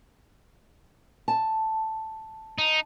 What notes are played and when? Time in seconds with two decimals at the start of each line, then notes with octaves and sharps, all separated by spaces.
1.28 A5
2.58 D#4